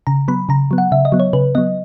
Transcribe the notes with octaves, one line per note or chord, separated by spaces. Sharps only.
C#3 A#5
F#3 B3 B5
C#3 A#5
F#3 B3
F#5
C#3 E5
D#5
F#3 B3
C#5
C#3 B4
F#3 B3 D#5